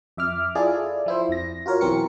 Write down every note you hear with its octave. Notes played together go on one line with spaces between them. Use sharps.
F2 E5 D6 F6
E4 F4 G#4 A4 D5
F3 E4 C5
F2 A#6
F4 F#4 A#4 C#5
B1 B2 E3 C4 A#4 C#7